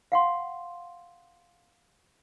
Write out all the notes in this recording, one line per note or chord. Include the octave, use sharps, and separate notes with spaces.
F5 F#5 C6